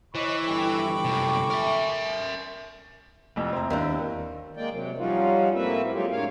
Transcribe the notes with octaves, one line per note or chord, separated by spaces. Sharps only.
E3 C5 C#5 D#5 B5 C#6 D6
G1 A4 G5
F#2 C3
A#4 E5
F1 F2 A2
C4 E4 A#5
D#2 D4
G#3 A#3 D5 G5
C3 F#3
F3 G3 C#4 D#4 F4 F#4
A2 A#3 C4 F#4 B4 E5
F#3 G#3 D#4 F4 G4
F2 A2 D3 A#3 C#5 F5